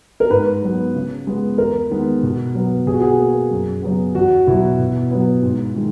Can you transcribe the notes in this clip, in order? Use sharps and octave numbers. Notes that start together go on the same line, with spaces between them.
A#4
G#2 B4
F#3 B3
C#3
G#3 B3
E2 A#4
D#3 G#3 B3
B2
F#3 B3
B2 G#4
F#4
G#4
A#3
F#2
C#3 F#3 B3
E2 F#4
B2 F#3 E4
B2
F#3 B3
G#2
D#3 G#3